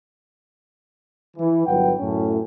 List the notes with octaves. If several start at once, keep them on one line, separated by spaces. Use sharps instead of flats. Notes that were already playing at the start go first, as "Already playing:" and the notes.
E3
G1 F#3 B4 F#5 G5
F#2 A2 C#4